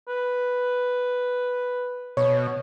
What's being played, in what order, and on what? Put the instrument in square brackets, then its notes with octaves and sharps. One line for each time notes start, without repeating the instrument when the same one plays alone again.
[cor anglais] B4
[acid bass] B2 [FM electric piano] C#5